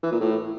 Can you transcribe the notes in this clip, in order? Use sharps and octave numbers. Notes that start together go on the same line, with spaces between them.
E3
A#2
A2